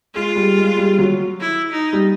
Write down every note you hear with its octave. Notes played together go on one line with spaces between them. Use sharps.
G#3 F4
G3
G#3
G3
F#3
E4
D#4
G3